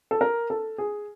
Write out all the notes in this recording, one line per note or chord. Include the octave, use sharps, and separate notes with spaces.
A4
A#4
A4
G#4